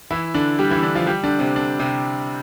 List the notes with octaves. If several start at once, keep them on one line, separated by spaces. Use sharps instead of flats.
E3 E4
D3 D4
G3 G4
E3 E4
D3 D4
F3 F4
G3 G4
D3 D4
C3 C4
D3 D4
C3 C4